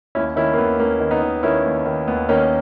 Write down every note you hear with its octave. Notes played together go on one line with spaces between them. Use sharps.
D#2 C#4 E4
D#3 C#4 E4
A#3
D#2 B3
D#2 A#3 C#4
D#3
B3 D#4
D#3
D#3 C#4 E4
D#2
D#3
D#2 B3
D#3 A#3 C#4